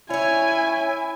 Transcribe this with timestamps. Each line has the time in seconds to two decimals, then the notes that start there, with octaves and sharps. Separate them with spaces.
0.10 C#4 E4 C#5 G#5